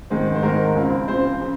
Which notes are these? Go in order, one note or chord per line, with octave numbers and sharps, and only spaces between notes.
G#2 D#3 G#3 C4
C5
G#2 D#3 G#3 C4 A#4
C#2 C#3 F3 C4
C#2 C#3 F3 C4 C5
C#3